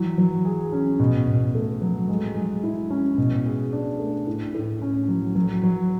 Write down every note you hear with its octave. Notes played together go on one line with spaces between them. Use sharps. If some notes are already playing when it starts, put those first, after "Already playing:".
Already playing: E3 F#3
F#3
G#4
C#4
B2
B2
A3
F#3
G#3
G#3
E4
C#4
B2
G#4
D4
A3
A2
A2
C#4
F#3
F#3
F#3